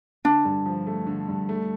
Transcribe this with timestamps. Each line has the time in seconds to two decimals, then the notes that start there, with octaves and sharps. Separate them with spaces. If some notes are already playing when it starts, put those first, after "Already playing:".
0.25 D3 D4
0.45 G2
0.66 F3
0.87 A3
1.07 D3
1.29 G2
1.49 A3